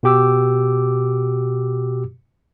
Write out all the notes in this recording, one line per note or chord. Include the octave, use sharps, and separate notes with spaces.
B2 F#4 G4 D6 E6